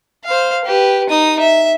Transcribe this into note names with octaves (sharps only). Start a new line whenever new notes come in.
C5 F5
G4 B4
D#4 D#6
E5